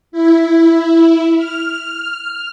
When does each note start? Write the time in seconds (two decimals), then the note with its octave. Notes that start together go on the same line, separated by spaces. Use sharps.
0.12 E4
1.36 F6